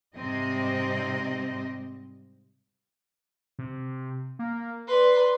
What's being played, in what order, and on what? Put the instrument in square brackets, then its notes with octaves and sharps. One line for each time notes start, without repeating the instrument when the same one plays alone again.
[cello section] G#2 C3 G3 C4 D#5
[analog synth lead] C3
A#3
[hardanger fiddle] B4 D5 [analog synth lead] C6